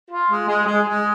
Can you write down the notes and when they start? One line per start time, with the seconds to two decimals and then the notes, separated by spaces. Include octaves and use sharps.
0.10 F4
0.30 G#3
0.48 G#3
0.66 G#3
0.86 G#3